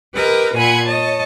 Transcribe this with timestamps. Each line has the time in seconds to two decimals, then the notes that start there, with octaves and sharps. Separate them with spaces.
0.14 G4 A#4 B4 D#5
0.55 A#2 F#5 G#5 B5 F#6 G#6
0.86 C#5 D#5 A5